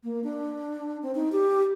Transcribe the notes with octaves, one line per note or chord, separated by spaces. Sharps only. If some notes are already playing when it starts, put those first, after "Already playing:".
A#3
D4
C4
D#4
G4